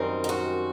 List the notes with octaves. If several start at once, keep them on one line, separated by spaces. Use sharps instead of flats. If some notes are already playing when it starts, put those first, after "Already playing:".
Already playing: F#2 D#3 G3 C4 A#4
D#4
F#4